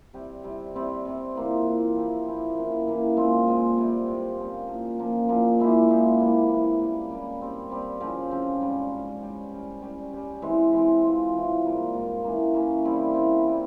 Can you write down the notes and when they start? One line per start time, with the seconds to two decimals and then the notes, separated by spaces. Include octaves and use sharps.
0.14 C3 G3 C4 G4
0.44 C3 G3 C4 G4
0.75 C3 G3 C4
1.05 C3 G3 C4
1.35 E3 A#3 F4
1.65 E3 A#3 F4
1.95 F3 C4 E4 G4
2.27 F3 C4 E4 G4
2.57 C#3 E3 A#3
2.87 C#3 E3 A#3
3.16 A#2 G#3 C4 F4
3.47 A#2 G#3 C4 F4
3.78 C3 G3 C4 G4
4.07 C3 G3 C4 G4
4.38 A#2 F3 A#3 C#4
4.67 A#2 F3 A#3 C#4
4.98 A#2 F3 A#3 C#4
5.29 A#2 F3 A#3 C#4
5.59 A#2 G#3 E4 G4
5.89 A#2 G#3 E4 G4
6.19 C3 E3 A#3
6.49 C3 E3 A#3
6.79 C#3 G3 A#3
7.10 C#3 G3 A#3
7.41 G3 C4 G4
7.70 G3 C4 G4
8.01 C#3 F3 C4 G4
8.31 C#3 F3 C4 G4
8.61 G#2 G3 C#4
8.91 G#2 G3 C#4
9.22 G3 C#4 G4
9.52 G3 C#4 G4
9.82 G3 C#4 G4
10.13 G3 C#4 G4
10.42 E3 G#3 C4
10.73 E3 G#3 C4
11.03 E3 G#3 C4 F4
11.33 E3 G#3 C4 F4
11.63 G#2 G3 A#3
11.93 G#2 G3 A#3
12.24 E3 A#3 C#4
12.54 E3 A#3 C#4
12.84 C#3 G3 C4 E4
13.14 C#3 G3 C4 E4
13.45 C3 G3 A#3 F4